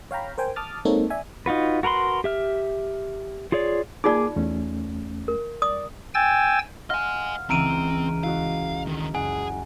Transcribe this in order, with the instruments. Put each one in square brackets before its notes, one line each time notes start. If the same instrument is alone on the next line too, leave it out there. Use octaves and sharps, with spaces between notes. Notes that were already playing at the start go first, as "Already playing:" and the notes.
[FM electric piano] C#5 F5 G5 A#5 B5
A#4 C5 G5 G#5
A5 D6 D#6 F6 A6
G#3 A#3 C4 D#4 A4 C#5
D5 E5 G#5
[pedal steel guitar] D#4 F4 F#4 B4
F#4 A#4 B4 B5 C6
G4 E5 F6
F4 G#4 C#5 D5
[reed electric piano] A#3 G#4 D6 [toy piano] D#4 F4 D5
[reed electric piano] E2 A3 C#4
[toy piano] A#4
[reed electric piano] D5 [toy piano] D#6
[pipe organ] G5 G#5 E6 A6
[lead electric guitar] D#5 G#5 [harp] F5 F#5 C6 [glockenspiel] F6
[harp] C#2 E3 E6 [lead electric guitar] C4 [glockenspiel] A#5 D7 D#7
[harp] E4 F#4 D#5 [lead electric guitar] F5
[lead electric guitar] D3 D#3
[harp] F#1 F#5 [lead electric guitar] G#4 [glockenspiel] G#5